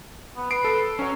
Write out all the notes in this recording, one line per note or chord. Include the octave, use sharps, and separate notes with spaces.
B3
B4 C7 D7
A4
F#3 C#4 C#5